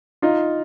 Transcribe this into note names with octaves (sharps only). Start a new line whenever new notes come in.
D#4 F4